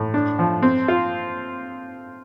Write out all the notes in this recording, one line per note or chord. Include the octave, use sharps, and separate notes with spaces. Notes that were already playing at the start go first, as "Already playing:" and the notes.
Already playing: A2
D4
F3
C4
F4